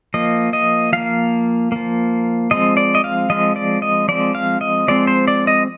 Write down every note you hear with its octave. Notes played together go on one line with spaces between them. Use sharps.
F3 A#3 D#5
D#5
F3 A#3 F5
F3 A#3
F3 G#3 C4 D#5
D5
D#5
F5
F3 G#3 C4 D#5
D5
D#5
F3 G#3 C4 D5
F5
D#5
F3 G#3 C4 D5
C5
D5
D#5